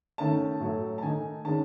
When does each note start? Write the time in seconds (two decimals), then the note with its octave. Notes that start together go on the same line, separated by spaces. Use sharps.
0.18 D#3 A3 C#4 A5
0.60 A2 F#3 A3
0.98 A5
1.02 D#3 A3 D#4 G#5
1.45 D#3 G#3 C#4 A5